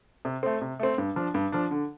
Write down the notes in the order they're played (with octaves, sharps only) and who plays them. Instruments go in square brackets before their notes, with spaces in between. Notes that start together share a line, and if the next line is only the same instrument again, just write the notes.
[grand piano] C3
A3 C4
C3
A3 C4
G2
F3 D4
G2
F3 D4
D3